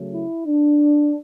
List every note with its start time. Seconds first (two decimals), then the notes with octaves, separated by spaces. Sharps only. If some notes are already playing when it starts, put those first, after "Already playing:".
Already playing: C#3 F#3 A3
0.13 E4
0.47 D4